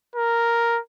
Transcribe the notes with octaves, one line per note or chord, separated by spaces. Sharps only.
A#4